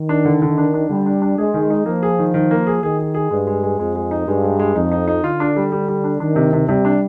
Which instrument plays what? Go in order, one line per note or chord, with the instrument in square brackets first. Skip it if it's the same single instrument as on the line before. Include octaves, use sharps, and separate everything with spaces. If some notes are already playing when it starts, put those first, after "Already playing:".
Already playing: [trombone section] D#3
[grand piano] D4
D3
D3
D4
D4
[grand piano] D3 [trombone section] G3
[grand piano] D4
D4
[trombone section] G#3 [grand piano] G#4
[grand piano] D#3
D#4
[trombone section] F3 [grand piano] A#3
[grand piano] G#4
D#3
D#3
A#3
G#4
[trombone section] D#3 [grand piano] G#4
[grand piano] G#4
G#4
[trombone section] G2 [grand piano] G#3
[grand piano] G#3
G#3
[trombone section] F2 [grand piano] G#3
[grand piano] G#3
D#4
[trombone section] G2 [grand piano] G#3
[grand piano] G#3
G#3
[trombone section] F2 [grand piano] D#4
[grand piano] D#4
D#4
[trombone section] D3 [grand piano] F4
[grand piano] D4
G3
G3
G3
D4
[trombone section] D#3 [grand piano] D4
[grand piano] C3
C3
[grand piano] C3 [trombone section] G3
[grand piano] D4